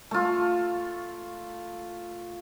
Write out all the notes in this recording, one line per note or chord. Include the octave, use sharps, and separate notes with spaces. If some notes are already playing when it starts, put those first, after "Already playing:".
A3 F4